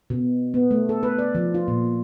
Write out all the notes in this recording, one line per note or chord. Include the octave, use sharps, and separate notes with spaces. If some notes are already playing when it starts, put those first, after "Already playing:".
B2
B3
A3
A4
B4
D5
F3
F4
A#2